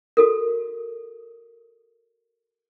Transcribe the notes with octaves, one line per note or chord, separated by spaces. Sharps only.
F#4 A4 A#4